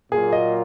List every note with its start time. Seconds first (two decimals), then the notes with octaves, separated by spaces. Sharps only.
0.12 A#2 F#3 A#3 F4 G#4
0.33 D#5